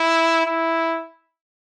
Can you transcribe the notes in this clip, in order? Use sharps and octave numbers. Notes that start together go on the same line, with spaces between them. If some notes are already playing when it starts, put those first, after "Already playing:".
Already playing: E4
E4